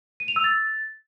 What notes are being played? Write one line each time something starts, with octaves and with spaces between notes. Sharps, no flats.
D#7
F7
E6
A6